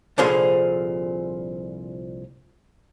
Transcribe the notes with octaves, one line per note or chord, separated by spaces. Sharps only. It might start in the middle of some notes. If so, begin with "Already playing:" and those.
C2 A#2 D3 F3 G#4 C6